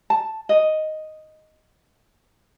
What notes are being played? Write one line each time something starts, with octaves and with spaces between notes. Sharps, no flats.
A5
D#5